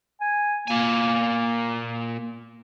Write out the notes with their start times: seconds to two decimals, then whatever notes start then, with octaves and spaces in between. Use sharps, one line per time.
0.21 G#5
0.68 A#2 A#3 G#5